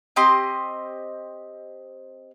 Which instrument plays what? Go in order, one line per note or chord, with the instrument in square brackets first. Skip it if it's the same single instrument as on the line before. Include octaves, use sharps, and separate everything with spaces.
[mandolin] C4 G4 D#5 C6